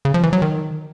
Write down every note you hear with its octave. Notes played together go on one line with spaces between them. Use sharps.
C#3
F3
E3
F#3
D#3